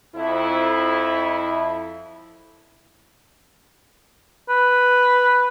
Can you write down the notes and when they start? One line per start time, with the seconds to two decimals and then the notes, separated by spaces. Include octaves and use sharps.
0.16 F2 E4
4.49 B4